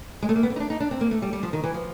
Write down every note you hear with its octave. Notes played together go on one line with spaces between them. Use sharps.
G#3
A3
A#3
B3
C4
D#4
D4
D#4
D4
C4
A#3
A3
G3
G3
F3
D#3
E3
F3